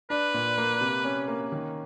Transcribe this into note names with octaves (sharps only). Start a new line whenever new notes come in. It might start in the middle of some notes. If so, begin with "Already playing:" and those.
D4 B4
A#2
A#3
C3
C#4
A#3
D#3